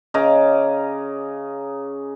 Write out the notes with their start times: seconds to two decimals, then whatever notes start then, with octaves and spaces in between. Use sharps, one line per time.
0.14 C#3 D#5 A#5 D6